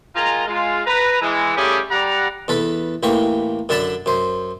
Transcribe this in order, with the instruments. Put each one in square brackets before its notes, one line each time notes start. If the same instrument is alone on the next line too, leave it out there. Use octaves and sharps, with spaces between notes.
[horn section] D#3 G#3 F4 G#5 A#5
G#3 F4
B4 A#5
E3 G#3
G3 A3 C#4 F4 G4 G#4
G3 F#5 A#5
[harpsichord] E2 A4 B4
A1 E3 A#3 G4 C#6
F#2 D3 D4 A4 A5 B5
F#2 C5